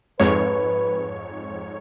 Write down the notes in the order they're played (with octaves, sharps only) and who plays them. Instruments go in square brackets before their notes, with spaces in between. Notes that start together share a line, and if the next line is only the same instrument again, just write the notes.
[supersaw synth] F2 G#2 C#5 [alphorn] B4